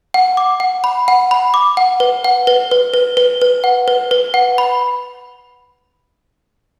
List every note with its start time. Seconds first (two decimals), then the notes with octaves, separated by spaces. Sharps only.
0.14 F#5
0.37 D6
0.60 F#5
0.84 B5
1.08 F#5
1.31 B5
1.54 D6
1.77 F#5
2.00 B4
2.24 F#5
2.47 B4
2.71 B4
2.94 B4
3.17 B4
3.42 B4
3.64 F#5
3.88 B4
4.11 B4
4.34 F#5
4.58 B5